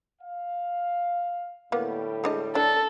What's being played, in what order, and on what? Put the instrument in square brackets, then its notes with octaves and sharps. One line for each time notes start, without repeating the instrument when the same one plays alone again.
[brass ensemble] F5
[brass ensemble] A2 D3 G3 [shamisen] A#3 B3
[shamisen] G#3 D4 D#5
[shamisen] D4 [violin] A4